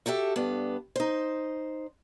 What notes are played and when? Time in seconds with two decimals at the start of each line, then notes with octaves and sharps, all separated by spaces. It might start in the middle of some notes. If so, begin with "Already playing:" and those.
0.06 F#4 G4 A4 E5
0.36 G2 B3 D4
0.96 D#4 C5